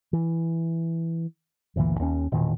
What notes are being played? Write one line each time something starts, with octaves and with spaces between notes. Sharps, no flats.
E3
G1 D2 A#2 E3
D#2 C#4
E1 A#2 D#3